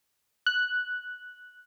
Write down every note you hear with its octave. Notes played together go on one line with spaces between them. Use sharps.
F#6